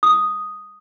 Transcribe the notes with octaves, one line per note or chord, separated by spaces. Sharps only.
D#6